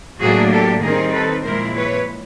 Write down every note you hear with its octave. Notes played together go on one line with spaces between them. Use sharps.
A2 F#3 A#3 D4 F#4 G#4
G4 A4
D#3 G3 C4 D#4 G#4 A#4
A4 B4
A#2 F3 G#3 C4 E4 A#4 C5
B4 C#5